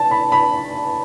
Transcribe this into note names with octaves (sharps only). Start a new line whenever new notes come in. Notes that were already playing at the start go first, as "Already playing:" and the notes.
Already playing: A5
B5
B5